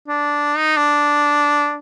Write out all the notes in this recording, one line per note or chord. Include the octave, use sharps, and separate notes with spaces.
D4
D#4
D4